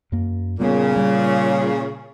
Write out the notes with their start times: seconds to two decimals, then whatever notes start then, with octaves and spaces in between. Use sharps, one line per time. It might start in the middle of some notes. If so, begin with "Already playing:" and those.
0.12 F#2 A#3
0.60 A#2 C#3 G3 A#3 B3
0.97 G3